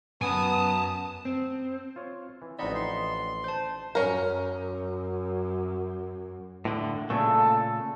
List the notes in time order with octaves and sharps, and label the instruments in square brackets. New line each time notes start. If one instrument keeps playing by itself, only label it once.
[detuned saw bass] F#2 [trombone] B3 [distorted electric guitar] G#5 A5 [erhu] D#6
[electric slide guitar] C4
[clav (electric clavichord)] F4 C#5
E3
[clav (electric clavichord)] A1 F3 C4 [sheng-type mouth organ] D#4 B5 [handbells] D5 D#5 F#5
[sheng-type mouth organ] C6
[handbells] C5 A5
[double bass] F#2 [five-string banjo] C#4 A#4
[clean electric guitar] A2 D3
[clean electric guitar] A#2 C#3 A3 [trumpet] A4